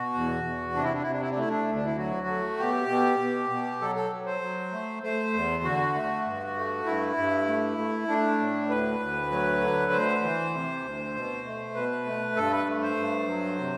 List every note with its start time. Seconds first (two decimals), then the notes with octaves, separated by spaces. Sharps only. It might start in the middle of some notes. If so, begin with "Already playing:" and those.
Already playing: B2 F#4
0.14 E2
0.44 E2
0.75 C3 D4
0.84 E4
0.94 D4
1.03 C3 E4
1.12 D4
1.21 E4
1.30 D4
1.37 A3 E4
1.49 D4
1.67 D2
1.75 D4
1.86 E4
1.97 F#3 F#4
2.27 A3
2.58 B2 G4
2.88 B2
3.19 B2
3.50 B2
3.81 F#3 A4
3.95 A4
4.11 F#3
4.26 C5
4.41 F#3
4.72 A3
5.03 A3 C5
5.33 E2
5.64 D3 F#4
5.94 A3
6.24 G2
6.56 A3
6.85 G2 E4
7.17 G2
7.48 A3
7.78 A3
8.08 A3 D4
8.39 A2
8.69 D2 B4
9.00 D2
9.31 F#3
9.61 D3
9.92 D2 C5
10.22 E3
10.53 C3
10.83 D2
11.14 B2
11.45 A3
11.74 B2 B4
12.05 A3
12.36 G2 A4
12.52 B4
12.67 A3
12.82 C5
12.96 G2
13.28 F#3
13.58 C3